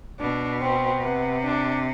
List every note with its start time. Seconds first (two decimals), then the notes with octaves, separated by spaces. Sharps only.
0.20 B2 D4
0.61 C4
1.02 C3 B3
1.44 D4